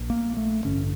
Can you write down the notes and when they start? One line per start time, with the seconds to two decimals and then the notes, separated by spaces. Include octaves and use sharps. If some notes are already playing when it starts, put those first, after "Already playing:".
Already playing: A#1 A#2
0.10 A#3
0.37 A3
0.65 A1 G2 D3 C#4